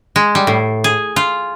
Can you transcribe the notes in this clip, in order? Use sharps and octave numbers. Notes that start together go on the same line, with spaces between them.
G#3
G3
A2
G#4
F4